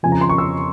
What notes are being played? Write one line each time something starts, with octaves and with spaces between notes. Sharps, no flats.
F2 C#3 F3 G#5
A#5
C6
C#6
E6